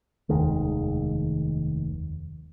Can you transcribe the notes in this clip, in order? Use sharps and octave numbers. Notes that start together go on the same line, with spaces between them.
F1 D#2 D#3 G#3